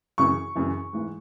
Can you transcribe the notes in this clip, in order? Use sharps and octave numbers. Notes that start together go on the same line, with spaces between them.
F#2 C#3 E3 C#6
F#2 C#3 E3
G#2 E3